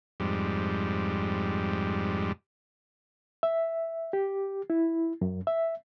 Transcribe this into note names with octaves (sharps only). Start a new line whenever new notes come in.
F2 G#2 G3
E5
G4
E4
F#2
E5